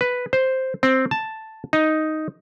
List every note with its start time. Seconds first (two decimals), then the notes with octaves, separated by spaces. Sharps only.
0.01 B4
0.33 C5
0.83 C4
1.11 A5
1.73 D#4